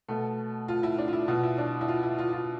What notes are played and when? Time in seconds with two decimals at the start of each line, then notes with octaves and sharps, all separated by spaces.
0.08 B2 A3
0.68 F4
0.83 E4
0.98 D4
1.08 F4
1.13 E4
1.28 B2 F4
1.43 E4
1.58 D4
1.81 E4
1.88 F4
2.03 E4
2.18 F4
2.33 F4